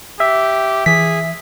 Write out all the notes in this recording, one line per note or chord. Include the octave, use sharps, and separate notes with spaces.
G4 E5
E3 G#4 B6